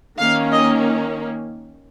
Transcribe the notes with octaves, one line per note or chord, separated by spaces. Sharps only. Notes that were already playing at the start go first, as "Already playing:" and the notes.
D#3 A#3 C#4 F5
D#5